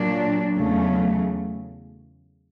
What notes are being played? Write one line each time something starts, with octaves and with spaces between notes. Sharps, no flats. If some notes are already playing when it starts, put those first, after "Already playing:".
Already playing: A#2 F#3 A#3 D4
E2 C#3 F#3 A3